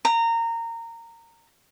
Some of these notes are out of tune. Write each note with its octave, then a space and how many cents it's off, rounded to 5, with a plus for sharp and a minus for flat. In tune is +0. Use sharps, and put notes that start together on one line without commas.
A#5 -20